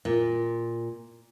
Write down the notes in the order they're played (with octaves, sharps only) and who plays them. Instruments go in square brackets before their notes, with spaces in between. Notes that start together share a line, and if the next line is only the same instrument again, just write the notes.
[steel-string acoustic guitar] A#2